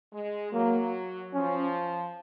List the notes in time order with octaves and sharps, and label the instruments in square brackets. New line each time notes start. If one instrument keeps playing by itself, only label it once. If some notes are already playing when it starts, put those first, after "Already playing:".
[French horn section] G#3
[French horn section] F#3 [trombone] A#3
[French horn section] F3 [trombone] C#4